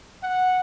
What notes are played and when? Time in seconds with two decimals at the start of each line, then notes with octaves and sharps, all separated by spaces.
0.22 F#5